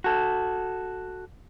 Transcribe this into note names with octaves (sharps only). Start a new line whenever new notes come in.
F#4 A4